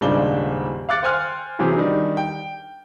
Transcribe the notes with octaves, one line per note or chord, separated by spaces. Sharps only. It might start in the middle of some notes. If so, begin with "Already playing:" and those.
D#1 G#2 C#3 D4 F4 G7
F5 D6 F#6 A6 C#7
C5 G5 G#5 C6 F6 F#6
C3 E3 F#3 C4 G4 G#4
D#3 G3 D4 D#4
G5